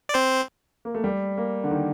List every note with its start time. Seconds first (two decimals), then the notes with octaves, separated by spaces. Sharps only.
0.09 D5
0.14 C4 C5
0.85 A#3
0.95 A3
1.04 G3
1.38 A#3
1.64 D3
1.71 D#3